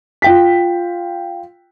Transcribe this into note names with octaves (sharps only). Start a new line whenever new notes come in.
F4 G5 B6